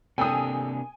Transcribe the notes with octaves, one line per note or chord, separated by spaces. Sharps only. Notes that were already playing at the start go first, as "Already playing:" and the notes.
C3 A#3 D4 A4 G5 G#5 D#6